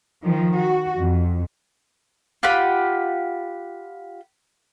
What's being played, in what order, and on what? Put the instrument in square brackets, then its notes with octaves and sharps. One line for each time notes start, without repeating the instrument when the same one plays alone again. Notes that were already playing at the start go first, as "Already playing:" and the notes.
[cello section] D#3 F3
F#4
F2
[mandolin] F4 G4 F#5 B5